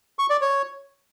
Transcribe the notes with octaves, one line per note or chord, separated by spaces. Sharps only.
C#6
D5
C#5